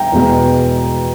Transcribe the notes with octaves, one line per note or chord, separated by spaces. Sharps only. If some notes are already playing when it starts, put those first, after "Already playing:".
Already playing: G5 A#5
E2 B2 G#3